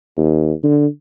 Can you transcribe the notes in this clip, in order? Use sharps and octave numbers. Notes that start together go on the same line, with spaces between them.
D#2
D3